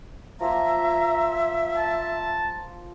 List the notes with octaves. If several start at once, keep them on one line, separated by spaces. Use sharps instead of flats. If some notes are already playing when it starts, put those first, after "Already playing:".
F3 A#3 F4 E5 A#5
A5